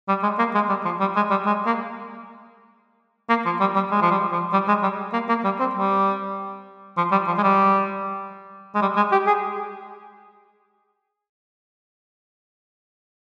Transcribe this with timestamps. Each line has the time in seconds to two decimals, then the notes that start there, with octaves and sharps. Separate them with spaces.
0.09 G3
0.23 G#3
0.39 A#3
0.55 G#3
0.69 G3
0.85 F3
1.01 G3
1.16 G#3
1.30 G3
1.46 G#3
1.66 A#3
3.29 A#3
3.46 F3
3.60 G3
3.75 G3
3.91 G#3
4.02 F3
4.11 G3
4.32 F3
4.53 G3
4.68 G#3
4.82 G3
5.13 A#3
5.29 A#3
5.44 G3
5.60 C4
5.75 G3
6.97 F3
7.12 G3
7.27 F3
7.38 G#3
7.43 G3
8.75 G#3
8.82 G3
8.97 G#3
9.12 G4
9.27 G#4